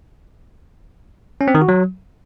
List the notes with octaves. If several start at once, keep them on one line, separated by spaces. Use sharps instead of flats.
C#4
C4
D#3
F#4
F#3